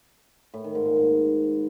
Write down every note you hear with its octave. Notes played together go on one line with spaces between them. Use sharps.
A2
D#3
G#2
A#2
G#2